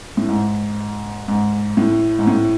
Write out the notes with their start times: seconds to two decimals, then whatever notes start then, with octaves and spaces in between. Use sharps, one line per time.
0.17 A2
0.28 G#2
1.28 G#2
1.77 A2
2.19 G#2
2.27 A2